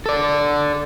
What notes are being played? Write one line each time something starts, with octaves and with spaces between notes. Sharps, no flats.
A4 D5